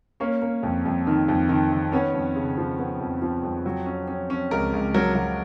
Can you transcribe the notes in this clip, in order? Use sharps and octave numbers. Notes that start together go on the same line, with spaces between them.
A#3 C#4 C#5
A#3
F2
F2
D#3
F2
D#3
D#3
B3 C#4 C#5
F2
C#3
F3
B3
F2
F3
F2
F#3
C#4
C#4
C#4
C#2 A#4
C#2
F#3 A#4
F#3